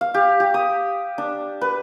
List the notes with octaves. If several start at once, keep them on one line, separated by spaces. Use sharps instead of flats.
F5
G4
G4
D#6
D4
B4